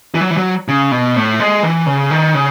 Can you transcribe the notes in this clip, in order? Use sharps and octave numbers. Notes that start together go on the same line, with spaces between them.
E3
F#3
E3
F#3
C#3
B2
A2
G#3
E3
C#3
D#3
C#3